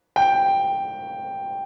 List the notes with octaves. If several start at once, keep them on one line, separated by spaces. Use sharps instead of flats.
G5